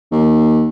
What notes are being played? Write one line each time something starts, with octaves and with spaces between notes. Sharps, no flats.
D#2